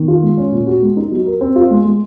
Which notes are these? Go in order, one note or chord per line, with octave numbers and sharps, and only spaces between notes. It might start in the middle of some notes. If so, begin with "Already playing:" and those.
Already playing: D#3
F4
G#3
C#4
A#2
F#4
G#3
D#4
F#3
A#4
C4
F4
G#3
G#3